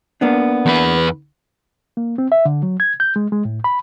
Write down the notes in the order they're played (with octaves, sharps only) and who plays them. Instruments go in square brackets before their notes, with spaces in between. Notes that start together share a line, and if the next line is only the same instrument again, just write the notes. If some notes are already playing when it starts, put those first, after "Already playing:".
[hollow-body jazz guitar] A#3 B3 D4
[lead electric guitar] E2 B4
[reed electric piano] A#3
C4
E5
D3
F#3
G#6
G6
G#3
G#3
A2
B5